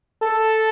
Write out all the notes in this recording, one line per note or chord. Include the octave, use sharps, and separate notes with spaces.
A4